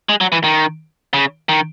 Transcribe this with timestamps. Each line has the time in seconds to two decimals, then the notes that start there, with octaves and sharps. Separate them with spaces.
0.09 G#3
0.21 F#3
0.32 E3
0.44 D#3
1.14 C#3
1.49 D#3